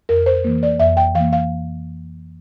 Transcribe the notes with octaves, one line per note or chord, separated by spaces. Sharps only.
F2 A#4
C5
E3 A#3
D5
F2 E5
G5
E3 A#3 F5
F5